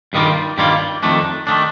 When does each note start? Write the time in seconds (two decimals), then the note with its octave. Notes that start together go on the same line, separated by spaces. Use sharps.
0.13 G2 D#3 G3 A#3 F4
0.58 G2 D#3 G3 A#3 F4
1.03 F2 D#3 A3 D4
1.47 D#3 A3 D4